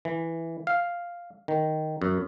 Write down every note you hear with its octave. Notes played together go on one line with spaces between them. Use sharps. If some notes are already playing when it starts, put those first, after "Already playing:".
E3
F5
D#3
F#2